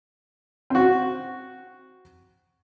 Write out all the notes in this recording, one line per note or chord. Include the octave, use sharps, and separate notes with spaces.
C4 F#4